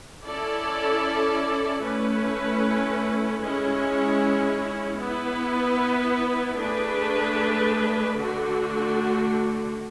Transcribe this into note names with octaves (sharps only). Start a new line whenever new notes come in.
C#4 E4 A4 D5
A3 C#4 E4 B4
G#3 C#4 E4
B3 E4 B4
A3 D4 G#4 B4
D3 A3 D4 F#4